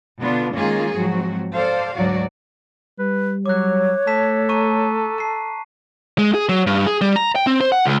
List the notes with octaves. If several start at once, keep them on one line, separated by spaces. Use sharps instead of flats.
B2 D3 B3 D4 F4
D#3 G#3 A#3 C#4 F4 G#4
G#2 F3 F#3 C4 F#4
A4 C5 D5 F5
D2 G#2 F#3 F#4 D5
G3 B4
F#3 C#5 D6 F#6
A3 A4 A5 B6 E7
A#5 C#6 D#7
A5 C7
G#3
G#4
F#3
G2
G#4
G3
A#5
G5
C4
C5
F#5
C#2